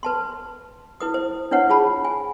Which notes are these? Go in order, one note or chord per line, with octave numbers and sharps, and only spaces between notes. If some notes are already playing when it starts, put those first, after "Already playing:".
B4 A5 C6
E4 B4 D#6
C5
D4 E4 B4 C#5 F#5
F4 G#4 A5 B5
G#5